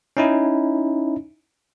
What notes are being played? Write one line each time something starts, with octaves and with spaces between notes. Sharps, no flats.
C#4 D#4 E4